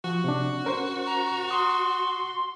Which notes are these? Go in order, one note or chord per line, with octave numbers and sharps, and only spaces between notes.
F3 F#4
C3 D4
C#4 A#4 C5
A#5
C6 D#6